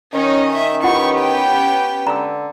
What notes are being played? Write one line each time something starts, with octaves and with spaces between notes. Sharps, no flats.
D#3 C#4 D#4 D#5
E5
B3 C#4 E4 F4 G4 F#5 C#6
G5
D3 A#5 E6